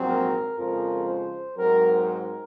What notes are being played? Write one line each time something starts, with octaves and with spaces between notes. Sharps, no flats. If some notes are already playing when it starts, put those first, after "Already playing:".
Already playing: A#1 G#2 F#3 C4
A#4
F2 C#3 F3 G#3 A#4
C5
G#2 F#3 C4 A#4
A#4